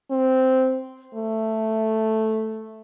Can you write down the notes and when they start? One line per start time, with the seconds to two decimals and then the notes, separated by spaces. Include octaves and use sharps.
0.11 C4
1.14 A3